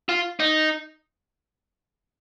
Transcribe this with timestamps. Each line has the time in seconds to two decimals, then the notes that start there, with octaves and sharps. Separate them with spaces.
0.09 F4
0.40 D#4